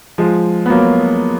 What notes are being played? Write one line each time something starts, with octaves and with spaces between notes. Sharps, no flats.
F3 G#3
B3
F#3 A#3